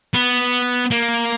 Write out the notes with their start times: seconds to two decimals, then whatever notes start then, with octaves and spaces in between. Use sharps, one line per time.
0.14 B3
0.91 A#3